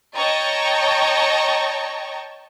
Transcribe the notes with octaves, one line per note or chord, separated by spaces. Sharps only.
C#5 D#5 G5 A5 A#5 C#6